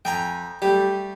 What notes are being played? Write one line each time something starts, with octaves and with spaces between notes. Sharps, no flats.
F2 G5 G#5 A#5
G3 A3 G4